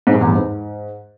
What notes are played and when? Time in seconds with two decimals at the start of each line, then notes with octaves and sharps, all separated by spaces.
0.07 G#2
0.14 G2
0.21 E2
0.28 G2
0.35 G#2